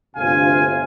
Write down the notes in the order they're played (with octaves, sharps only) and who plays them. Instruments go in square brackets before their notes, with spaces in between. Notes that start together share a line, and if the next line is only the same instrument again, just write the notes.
[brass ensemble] G1 D2 C3 F4 F5 G#5